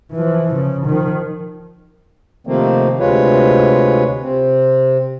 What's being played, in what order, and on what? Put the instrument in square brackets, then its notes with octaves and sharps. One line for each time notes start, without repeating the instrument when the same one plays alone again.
[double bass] E3 F3
C#3
D#3 F3
[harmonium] C3 D#3 F3 A3 A#3 C4
D2 C3 G#3 F4 B4 C#5
C3 C4